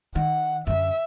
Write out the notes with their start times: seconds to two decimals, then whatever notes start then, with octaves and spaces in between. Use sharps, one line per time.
0.16 D#3 F#5
0.67 F#2 D3 E5